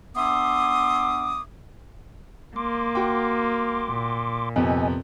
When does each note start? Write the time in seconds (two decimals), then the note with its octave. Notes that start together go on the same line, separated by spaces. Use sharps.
0.15 B3 D4 E5 C6 D6 D#6
2.56 A#3 C6 D6
2.95 F#4 G5
3.92 A#2
4.56 F2 C3 B3 D#5 G#5